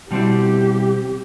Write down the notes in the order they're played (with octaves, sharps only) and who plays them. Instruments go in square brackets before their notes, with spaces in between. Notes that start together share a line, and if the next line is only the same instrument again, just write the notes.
[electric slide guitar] B2 G3 C4 E4 [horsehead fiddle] G4